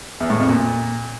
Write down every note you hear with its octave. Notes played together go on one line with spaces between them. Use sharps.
E2
A2
F2
A#2